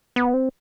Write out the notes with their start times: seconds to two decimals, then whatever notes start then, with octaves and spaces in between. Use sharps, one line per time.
0.16 B3
0.34 C4